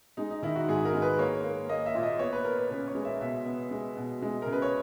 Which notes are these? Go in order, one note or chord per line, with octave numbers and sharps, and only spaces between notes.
G#3 D#4
D#4
D#3 E4
F#4
G#2 G#4
A#4
G#3
B4
A#3 C#5
A#3
A#3 D#5
E5
A#2
D#5
B3 C#5
B4
B3 A#4
B4
C#3 B4
C#5
G#3
E5
B2 E5
B3
G#3
B2
G#3
C#3 A#4
B4
C#5